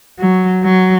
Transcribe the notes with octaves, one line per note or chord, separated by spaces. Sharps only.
F#3
F#3